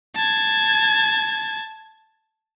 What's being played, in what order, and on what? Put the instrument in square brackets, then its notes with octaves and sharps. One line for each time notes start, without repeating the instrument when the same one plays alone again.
[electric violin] A5 G#6